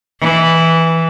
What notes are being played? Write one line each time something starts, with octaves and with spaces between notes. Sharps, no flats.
E3